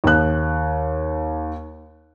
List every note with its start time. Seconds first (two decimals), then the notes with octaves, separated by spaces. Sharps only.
0.04 D#2 F#6